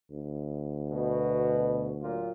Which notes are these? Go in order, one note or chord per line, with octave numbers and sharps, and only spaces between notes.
D2
B2
A#2 F#3 F4